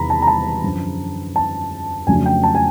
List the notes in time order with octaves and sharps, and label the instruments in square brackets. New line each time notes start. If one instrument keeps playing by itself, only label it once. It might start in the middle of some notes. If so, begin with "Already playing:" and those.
Already playing: [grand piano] E2 C3 D#3 A#5 B5
A5
A#5
A5
F#2 D3 F3
A5
F2 C#3 F#3 A3 D4 G#5
G5
A5
G#5